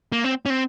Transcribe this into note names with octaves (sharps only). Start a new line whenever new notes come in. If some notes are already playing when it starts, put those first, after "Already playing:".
A#3
C4
C#4
C4